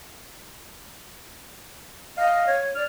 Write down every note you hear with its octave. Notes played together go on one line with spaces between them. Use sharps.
D#5 F5
C#5
D5 F6